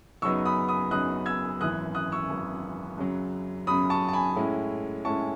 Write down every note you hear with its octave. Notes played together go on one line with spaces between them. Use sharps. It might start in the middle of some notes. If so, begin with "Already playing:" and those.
F#2 C#3 F#3 B3 D#4 C#6 E6
B5 D#6
B5 D#6
F#2 C#3 F#3 B3 D#4 D#6 F#6
E6 G#6
G#1 F#2 E3 D#6 F#6
D#6 F#6
C#6 E6
G#1 F#2 E3
F#2 C#3 F#3
F#2 C#3 F#3 B5 D#6
A5 C#6
A5
G#5 B5
A2 G#3 C#4 E4
A2 G#3 C#4 E4 A5 C#6